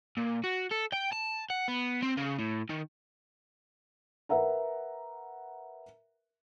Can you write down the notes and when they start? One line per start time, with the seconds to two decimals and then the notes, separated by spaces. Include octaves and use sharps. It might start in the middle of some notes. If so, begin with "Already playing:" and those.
0.17 A#2
0.44 F#4
0.71 A4
0.92 G5
1.12 A5
1.50 F#5
1.68 B3
2.02 C4
2.17 C#3
2.39 A2
2.69 D#3
4.29 A#4 B4 E5 F#5 A#5